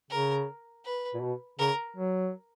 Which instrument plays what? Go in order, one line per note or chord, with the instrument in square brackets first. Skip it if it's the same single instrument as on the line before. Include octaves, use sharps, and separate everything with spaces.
[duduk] C#3 [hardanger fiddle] A#4
[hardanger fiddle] B4
[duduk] A#2
B2
[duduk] C#3 [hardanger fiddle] A#4
[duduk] F#3